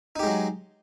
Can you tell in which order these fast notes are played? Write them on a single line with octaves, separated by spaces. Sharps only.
D#4 G4 G#3 F#3